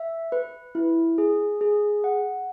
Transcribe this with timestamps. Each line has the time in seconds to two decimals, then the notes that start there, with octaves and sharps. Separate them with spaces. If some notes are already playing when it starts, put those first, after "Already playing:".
Already playing: E5
0.32 B4
0.75 E4
1.18 G#4
1.61 G#4
2.04 F#5